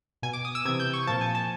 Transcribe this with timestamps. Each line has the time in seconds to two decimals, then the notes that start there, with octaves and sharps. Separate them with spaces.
0.22 B2 G#5
0.33 D6
0.45 D#6
0.55 E6
0.65 C3 E3 G#6
0.80 G6
0.93 C#6
1.07 A#2 F3 A5
1.21 G#5
1.35 A5